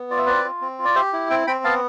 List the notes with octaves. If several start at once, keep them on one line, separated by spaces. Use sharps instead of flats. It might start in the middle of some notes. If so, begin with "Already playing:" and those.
Already playing: B3
F4 D5
E5
C4 B4 D5
F4
C4
F4
D5
G4 C5 E5
E4
C4 E5 G5
C4 G5 B5
B3 F5 A5